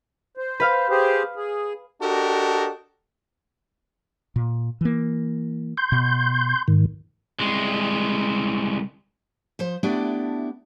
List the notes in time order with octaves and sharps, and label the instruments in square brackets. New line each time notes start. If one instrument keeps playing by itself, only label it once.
[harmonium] C5
[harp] B4 F5 F6
[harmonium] G4 G#4 C5
G#4
[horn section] D4 F#4 G4 A4 A#4 D#5
[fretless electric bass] A#2
E3 A#3
[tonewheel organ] C6 G6
[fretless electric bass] B2
[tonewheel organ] G#2 D#3
[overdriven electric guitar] C2 G#3
[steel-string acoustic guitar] F3 C5
A3 B3 D4 E4 G4 D5